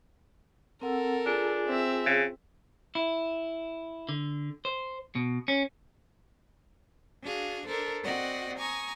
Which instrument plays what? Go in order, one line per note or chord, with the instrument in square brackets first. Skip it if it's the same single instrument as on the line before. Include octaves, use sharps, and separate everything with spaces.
[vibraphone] C4 F#5 E6 [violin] A4 A#4
[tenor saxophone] D4 [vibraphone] F4 G#4 G#5
[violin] C4 E5
[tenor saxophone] C#3
[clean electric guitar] E4
D3
C5
B2
C#4
[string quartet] D4 F#4 G#4 F5
D4 A4 A#4 C5
C4 F#4 D5 D#5 F#5
G#5 A#5 C#6 D#6